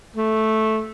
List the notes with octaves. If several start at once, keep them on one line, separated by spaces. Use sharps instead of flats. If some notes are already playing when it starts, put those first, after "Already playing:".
A3